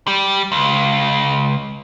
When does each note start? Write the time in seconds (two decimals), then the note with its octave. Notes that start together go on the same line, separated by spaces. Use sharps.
0.07 G3
0.52 C#2